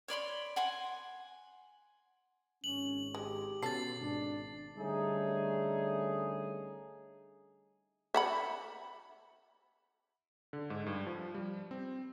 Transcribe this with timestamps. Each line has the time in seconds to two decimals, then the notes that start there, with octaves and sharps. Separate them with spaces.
0.08 C#5 D5 B5 C6
0.56 F#5 G#5 C6
2.64 G#1 C#4 F#7
3.14 G#3 G4
3.63 B2 C#4 A4 A6 C7
4.00 G#1 D4
4.77 D3 G3 A3 C#4 D#4 G#4
8.14 E5 F#5 B5
10.53 D3
10.70 G#2
10.86 G2
11.06 F3
11.34 G3
11.71 C4